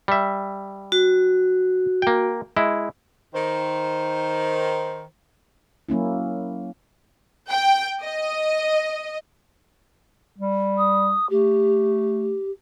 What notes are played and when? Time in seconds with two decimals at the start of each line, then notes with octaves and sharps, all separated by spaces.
0.08 G3 E5
0.92 F#4
2.02 A#3 G5
2.57 G#3 E4
3.34 D#3 C5
5.89 F#3 A#3 C#4 E4
7.50 G5
8.02 D#5
10.38 G3
10.77 D#6
11.29 A3 G4